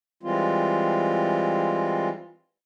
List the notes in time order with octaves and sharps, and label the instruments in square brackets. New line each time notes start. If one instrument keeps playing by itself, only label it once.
[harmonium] E3 G3 G#3 C4 F4